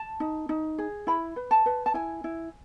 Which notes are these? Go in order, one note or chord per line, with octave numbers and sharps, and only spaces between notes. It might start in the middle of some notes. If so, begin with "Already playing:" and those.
Already playing: A5
D#4
D#4
G#4
E4 B5
B4
A5
B4
A5
E4 G#5
E4